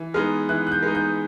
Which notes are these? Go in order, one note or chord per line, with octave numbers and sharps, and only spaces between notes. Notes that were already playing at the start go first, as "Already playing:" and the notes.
Already playing: E3
G#3 B3 D#4 F6
E3 F#6
F#6
G6
G#3 B3 D#4
G6